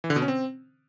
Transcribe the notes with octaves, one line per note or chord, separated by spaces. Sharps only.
E3
D3
B2
C#4
C4